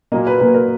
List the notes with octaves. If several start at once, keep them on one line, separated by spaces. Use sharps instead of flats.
A#2 F#3 A#3 D#5
B4
A#2 F#3 A#3 B4
A#4